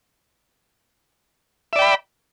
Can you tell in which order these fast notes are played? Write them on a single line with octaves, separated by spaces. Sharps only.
E5 D5 G5 B5